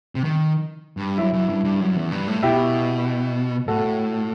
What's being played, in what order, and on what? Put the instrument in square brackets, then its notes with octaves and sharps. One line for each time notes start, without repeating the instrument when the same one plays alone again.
[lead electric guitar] C3
D#3
G2
[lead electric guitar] F#2 [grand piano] E4
[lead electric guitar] F#2
G2
G2
F#2
E2
G2
A2
[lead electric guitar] B2 [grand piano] E4 G4
[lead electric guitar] A2 [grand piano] F#4 A4